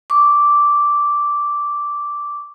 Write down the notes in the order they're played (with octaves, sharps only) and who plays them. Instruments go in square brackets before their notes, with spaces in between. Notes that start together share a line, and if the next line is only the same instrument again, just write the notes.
[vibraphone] C#6 D6